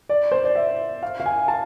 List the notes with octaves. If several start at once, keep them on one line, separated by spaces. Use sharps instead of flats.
D5
C5
D5
E5
F5
F5
G#5
A5